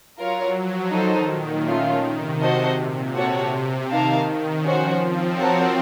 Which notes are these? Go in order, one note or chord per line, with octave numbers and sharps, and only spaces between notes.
F#3 F4 A#4 C#5
F3
D#3 D#4 A4 C5 D#5
A#2
D#3 A3 C#4 F4
C3
F#4 C5 D#5 F#5 A5
A#2
C3 F#4 A4 C#5 F#5
C3
D#3 A#3 D#4 A#4 F5 A5
D#3
F3 C#4 F#4 C5 F#5
C4
F#4 A#4 C#5 F#5 A5